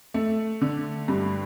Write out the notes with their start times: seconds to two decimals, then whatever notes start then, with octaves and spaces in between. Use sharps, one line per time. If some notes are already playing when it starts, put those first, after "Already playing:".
0.14 A3
0.61 D3
1.08 G2